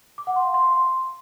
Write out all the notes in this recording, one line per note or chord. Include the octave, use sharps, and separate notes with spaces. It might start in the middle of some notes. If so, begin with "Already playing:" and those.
D6
F#5
C6
F5
C6